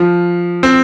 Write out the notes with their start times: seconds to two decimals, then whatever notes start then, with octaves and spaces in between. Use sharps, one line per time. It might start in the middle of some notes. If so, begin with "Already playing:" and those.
Already playing: F3
0.63 C4